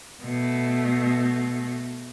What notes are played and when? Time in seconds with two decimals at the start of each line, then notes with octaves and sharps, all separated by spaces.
0.22 B2 A3